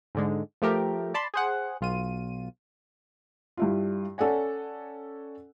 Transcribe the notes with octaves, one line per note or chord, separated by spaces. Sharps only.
G#2 D3 G#3
F3 A3 G4 A#4
D5 A5 B5 C6
G#4 C5 F#5
B1 F4 D#7
G2 E4 F4
C#4 A4 D5 F#5 G#5